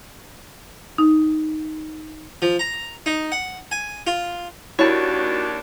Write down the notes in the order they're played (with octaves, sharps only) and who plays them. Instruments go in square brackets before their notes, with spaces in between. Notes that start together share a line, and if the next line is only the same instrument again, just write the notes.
[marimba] D#4
[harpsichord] F3
A#5
D#4
F#5
G#5
F4
[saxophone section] D#2 D4 [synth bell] E4 [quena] F#4 [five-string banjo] C#5 A5